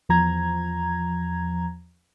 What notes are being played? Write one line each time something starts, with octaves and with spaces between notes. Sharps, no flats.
E2 F3 A#5 G#6